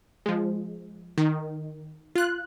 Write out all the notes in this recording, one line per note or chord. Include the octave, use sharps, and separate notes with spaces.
F3 G#3
D#3
F4 F#6